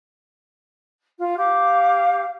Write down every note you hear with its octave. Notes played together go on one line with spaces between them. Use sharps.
F4
G4 F5 D6